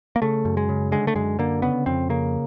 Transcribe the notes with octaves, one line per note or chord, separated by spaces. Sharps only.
A#3
C#3 A3
F#2
G#3
C#3
D3 G#3
A3
F#2 G#3
D3 A#3
C#3 B3
F2 C4
C#3 A#3